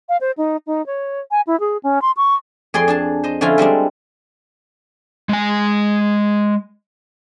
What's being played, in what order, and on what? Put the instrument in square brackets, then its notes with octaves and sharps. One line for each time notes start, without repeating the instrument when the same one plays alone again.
[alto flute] F5
C5
D#4
D#4
C#5
G#5
E4
G#4
C#4
C6
C#6
[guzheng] F2 G#4 D5 C6
D4 G#4 A5
C5 D#5
D3 F3 C#4 E4 F4 G#4
G3 G#3 C4 D4
[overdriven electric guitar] G#3 G#5